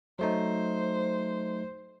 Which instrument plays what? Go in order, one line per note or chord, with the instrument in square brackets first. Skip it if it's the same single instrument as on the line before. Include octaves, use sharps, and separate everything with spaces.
[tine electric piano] F#3 A3 D#4 [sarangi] C5